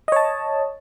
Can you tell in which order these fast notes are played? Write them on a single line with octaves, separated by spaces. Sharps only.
D#5 C#5 A5